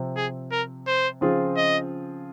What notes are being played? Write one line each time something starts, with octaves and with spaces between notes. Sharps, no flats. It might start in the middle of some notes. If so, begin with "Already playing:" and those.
Already playing: C3 F3 C4
G#4
A#4
C5
C#3 F3 C4 F4 G#4
D#5